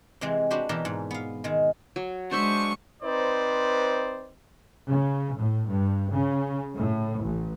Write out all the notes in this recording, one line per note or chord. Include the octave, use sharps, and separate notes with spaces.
C3 E3 G#3 C4
D4 F#4 G4 B4 C5
B2 E3 G4 A#4 E5
G#2
B3 F5
D#3 G#3
F#3
G#3 D4 C5 E5 C#6
C4 D#4 B4 C5 D5
C#3
A2
G2
C#3
A2
A1